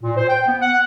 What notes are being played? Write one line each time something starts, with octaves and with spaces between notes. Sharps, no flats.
A#2
C5
G5
B3
F#5